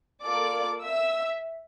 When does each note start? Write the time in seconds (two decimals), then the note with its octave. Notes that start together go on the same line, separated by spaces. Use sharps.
0.23 A#3 F4 A4 D5 D6
0.82 E5 E6